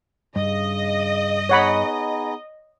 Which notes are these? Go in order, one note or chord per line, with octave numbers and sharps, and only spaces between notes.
G2 C#3 D#5
B3 D#4 G#4 C#5 F#5 B5